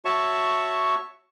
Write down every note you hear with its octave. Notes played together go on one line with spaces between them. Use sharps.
F#4 C#5 E5 A5 C#6